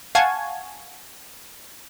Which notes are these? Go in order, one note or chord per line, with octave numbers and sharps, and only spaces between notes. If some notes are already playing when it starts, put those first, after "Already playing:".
F5 F#5 G#5 A5 C#6 G#6